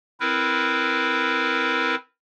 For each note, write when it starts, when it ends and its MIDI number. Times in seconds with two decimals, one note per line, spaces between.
0.20 1.95 60
0.20 1.95 64
0.20 1.95 70
0.20 1.95 71